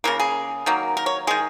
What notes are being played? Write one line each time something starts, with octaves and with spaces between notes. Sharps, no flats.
C#3 F#3 A#3 A#4
G#4
D#3 F#3 A#3
A#4
C#5
D#3 G#3 G#4